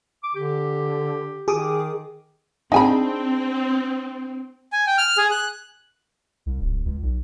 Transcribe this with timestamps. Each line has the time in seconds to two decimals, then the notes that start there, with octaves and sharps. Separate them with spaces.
0.23 D6
0.35 D3 G4
1.48 D#3 G#4 D6 D#6
2.72 C4 D4 D#4 G#4 G#5 B5
4.72 G#5
4.87 G5
4.98 F6
5.17 G#4
5.31 F#6
6.46 C2
6.61 D1
6.85 C#2
7.02 B1